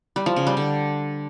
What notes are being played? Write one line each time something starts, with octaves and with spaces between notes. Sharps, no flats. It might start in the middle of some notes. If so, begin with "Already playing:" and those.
G3
F3
C#3
G3
D3